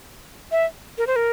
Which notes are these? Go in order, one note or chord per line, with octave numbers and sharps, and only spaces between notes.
E5
A#4
C5
A#4